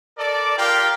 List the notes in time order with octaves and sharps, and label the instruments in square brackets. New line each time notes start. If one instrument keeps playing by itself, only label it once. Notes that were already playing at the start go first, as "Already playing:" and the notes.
[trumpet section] A4 A#4 D5
F4 G4 A#4 F5 G5